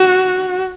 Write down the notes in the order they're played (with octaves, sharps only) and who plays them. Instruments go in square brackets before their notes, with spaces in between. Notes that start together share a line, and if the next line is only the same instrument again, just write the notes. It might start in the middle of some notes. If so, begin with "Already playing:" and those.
Already playing: [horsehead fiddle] F#4